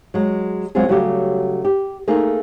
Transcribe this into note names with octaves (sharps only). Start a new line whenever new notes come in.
F#3 G#3
F#3 G#3 C4 F4 G#4
C#3 F#3 G3 A3 F#4 G4
G4
A3 A#3 D#4 G#4